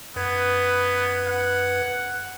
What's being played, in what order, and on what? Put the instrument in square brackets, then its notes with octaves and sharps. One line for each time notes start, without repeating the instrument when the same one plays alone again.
[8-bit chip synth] F#2 B4 G#6 [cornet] B3
[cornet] F#5